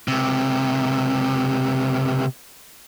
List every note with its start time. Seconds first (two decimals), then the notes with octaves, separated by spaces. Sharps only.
0.08 C#2 C3